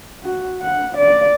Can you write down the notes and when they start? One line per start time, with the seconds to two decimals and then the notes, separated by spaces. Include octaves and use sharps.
0.23 F#4
0.62 F#5
0.97 D5